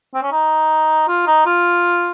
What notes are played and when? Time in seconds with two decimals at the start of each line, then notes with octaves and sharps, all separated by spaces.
0.15 C4
0.23 C#4
0.32 D#4
1.08 F4
1.27 D#4
1.46 F4